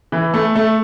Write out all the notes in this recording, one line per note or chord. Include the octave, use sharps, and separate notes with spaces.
E3
A3
A3